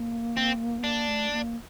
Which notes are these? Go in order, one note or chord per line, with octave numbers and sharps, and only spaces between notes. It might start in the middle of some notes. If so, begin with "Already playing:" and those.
Already playing: A#3
C4
B3
A#3 D4
A3
A#3